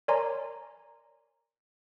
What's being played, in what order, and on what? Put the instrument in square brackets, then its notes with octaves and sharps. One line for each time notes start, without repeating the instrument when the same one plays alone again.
[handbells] A#4 C#5 D5 G#5 A#5 C6